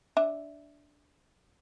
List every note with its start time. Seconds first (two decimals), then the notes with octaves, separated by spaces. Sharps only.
0.17 D4 E5